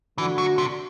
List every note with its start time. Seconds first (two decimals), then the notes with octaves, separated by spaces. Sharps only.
0.18 D3 E3 A3 D4 F#4
0.38 F#3
0.58 C3